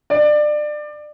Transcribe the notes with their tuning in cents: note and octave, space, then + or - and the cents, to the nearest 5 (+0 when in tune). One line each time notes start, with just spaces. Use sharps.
D5 +25